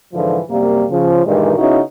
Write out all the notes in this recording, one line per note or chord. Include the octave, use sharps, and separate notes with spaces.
G#2 D3 E3 F3
F#2 C3 G3 A#3
C#3 F3
G2 A#2 D#3 E3 G3 G#3
C#3 B3 C#4 D#4 E4 F#4